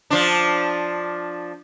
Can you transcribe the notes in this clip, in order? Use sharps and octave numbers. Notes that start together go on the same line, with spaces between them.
F3 D4